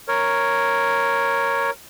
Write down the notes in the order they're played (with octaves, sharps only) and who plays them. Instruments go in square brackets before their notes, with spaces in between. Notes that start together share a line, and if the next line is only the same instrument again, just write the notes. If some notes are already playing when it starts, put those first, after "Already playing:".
[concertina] A#4 C#5